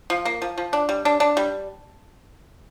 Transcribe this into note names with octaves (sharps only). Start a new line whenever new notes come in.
F3
A#3
F3
F3
D4
G3
D4
D4
G3